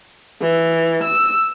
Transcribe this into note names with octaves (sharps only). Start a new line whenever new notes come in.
E3
E6